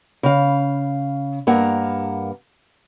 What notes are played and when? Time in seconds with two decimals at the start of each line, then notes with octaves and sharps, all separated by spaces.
0.23 C#3 F5
1.47 G2 A#3 A#4 F#5